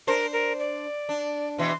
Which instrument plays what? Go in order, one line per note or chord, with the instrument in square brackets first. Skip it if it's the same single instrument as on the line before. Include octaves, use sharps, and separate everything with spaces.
[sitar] D4 C5 [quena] A#4
[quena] A#4
D5
[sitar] D4
[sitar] B2 E3 [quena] C6